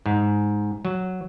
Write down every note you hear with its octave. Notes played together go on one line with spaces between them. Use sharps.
G#2
F#3